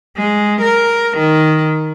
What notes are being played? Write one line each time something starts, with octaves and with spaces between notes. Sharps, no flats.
G#3
A#4
D#3